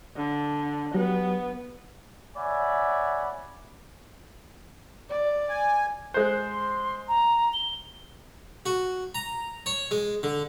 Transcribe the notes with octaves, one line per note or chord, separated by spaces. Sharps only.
D3
F#3 B3 G4
C#5 D5 E5 F#5 G#5 B5
D5
G#5
G#3 C5 F#6
C6
A#5
G7
F#4
A#5
C#5
G#3
D3